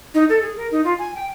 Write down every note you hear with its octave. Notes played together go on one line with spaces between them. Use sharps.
D#4
A4
G#4
A#4
D#4
F4
G#5
G5